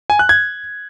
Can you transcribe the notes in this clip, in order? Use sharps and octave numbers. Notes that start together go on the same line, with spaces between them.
G#5
F#6
G#6